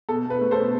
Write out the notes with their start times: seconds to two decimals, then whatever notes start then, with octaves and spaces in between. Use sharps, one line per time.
0.09 B2 A4
0.25 B2 B4
0.41 A3
0.51 A4 C5
0.57 B2